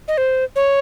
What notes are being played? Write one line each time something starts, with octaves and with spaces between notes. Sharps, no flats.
D#5
C5
C#5